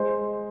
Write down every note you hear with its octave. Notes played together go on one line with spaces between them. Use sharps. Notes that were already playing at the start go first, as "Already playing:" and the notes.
Already playing: G#3 C5